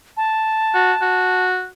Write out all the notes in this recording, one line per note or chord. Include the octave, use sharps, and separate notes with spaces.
A5
F#4
F#4